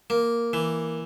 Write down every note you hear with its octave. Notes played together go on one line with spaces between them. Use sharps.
A#3
E3